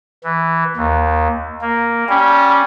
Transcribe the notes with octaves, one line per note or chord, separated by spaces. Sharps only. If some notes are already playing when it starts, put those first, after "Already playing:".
E3
D#2
A#3
G3 C#4